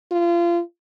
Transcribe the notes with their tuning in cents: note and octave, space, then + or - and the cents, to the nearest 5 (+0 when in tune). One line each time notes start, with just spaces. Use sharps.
F4 -30